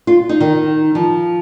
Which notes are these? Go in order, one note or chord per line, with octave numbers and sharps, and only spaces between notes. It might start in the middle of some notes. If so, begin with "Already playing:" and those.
F4
D#4
D#3
F3